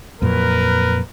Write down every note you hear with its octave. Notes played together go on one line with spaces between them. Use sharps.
F2 A#2 F#3 A#4 B4